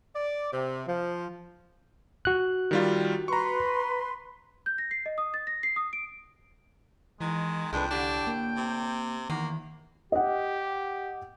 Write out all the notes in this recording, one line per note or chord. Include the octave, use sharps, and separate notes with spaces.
D5
C3
F3
F#4 F#6
D#3 G3 F4
B4 A#5 C6 C#6
G6
A#6
C7
D#5
D#6
A6
A#6
C7
D#6
D7
D#3 E3 G#3
C2 F2 G#3 D4 B4 G5
A2 D3 D4 G4
A#3
C3
E2 D#3 A#3
G4 D#5 F#5